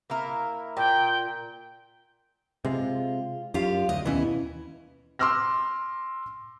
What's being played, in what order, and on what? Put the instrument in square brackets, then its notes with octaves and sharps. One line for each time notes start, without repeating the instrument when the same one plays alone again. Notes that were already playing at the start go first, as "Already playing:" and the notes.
[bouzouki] A#3 E4 A#4
[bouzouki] A#2 [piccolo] G5
[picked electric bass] C3 G#3 [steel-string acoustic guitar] F4
[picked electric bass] F#2 [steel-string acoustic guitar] F4 G4 F5
[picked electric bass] D2 [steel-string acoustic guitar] D#5
[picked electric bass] D#2 B2 E3 [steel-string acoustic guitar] C#4 E4
[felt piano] C6 D6 E6 F6 A#6